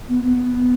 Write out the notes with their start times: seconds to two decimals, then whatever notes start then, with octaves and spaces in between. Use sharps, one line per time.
0.09 B3
0.24 B3